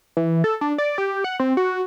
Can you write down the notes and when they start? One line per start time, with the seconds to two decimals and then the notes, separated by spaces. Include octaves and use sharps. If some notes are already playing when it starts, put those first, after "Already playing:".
0.17 E3
0.44 A4
0.61 D4
0.78 D5
0.98 G4
1.24 F#5
1.40 C4
1.57 F#4